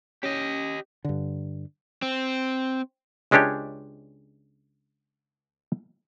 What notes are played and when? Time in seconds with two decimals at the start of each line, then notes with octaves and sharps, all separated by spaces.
0.23 C#4 G4 D#5
1.04 G2 D3
2.02 C4
3.31 C#2 G#3 C#4 D4 G4 C#5